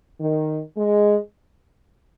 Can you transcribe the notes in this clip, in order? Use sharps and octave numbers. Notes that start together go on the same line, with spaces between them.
D#3
G#3